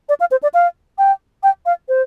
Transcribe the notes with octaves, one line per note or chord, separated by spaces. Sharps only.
D5
F5
C5
D5
F5
G5
G5
F5
C5